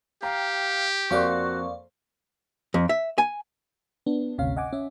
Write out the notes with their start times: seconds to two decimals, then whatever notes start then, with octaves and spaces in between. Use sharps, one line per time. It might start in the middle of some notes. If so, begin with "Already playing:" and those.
0.23 G4 F5 G5 A#5
1.10 F2 A#3 F#4 D5 F5 C6 C#6
2.74 F2
2.89 E5
3.18 G#5
4.06 B3 D4
4.38 G#1 D2 C3 C#4 F5
4.57 D#5 F#5 G#5 D6
4.73 C#4 E5